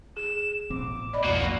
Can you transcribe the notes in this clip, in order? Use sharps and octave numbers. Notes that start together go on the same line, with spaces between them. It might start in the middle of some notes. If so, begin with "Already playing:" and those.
G#4 E7
A1 B2 C4 D6
D5 D#5 B5
B1 F2 G#2 A#3 F#4